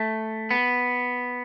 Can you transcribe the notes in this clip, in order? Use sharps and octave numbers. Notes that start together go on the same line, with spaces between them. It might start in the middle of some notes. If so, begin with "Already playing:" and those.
Already playing: A3
B3